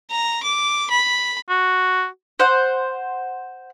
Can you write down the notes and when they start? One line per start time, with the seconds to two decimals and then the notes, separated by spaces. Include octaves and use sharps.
0.11 A#5
0.43 D6
0.90 B5
1.49 F#4
2.40 C5 F#5